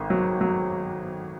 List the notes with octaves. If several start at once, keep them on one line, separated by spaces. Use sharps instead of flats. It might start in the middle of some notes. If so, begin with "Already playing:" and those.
Already playing: G#1 D#3
F#3
F#3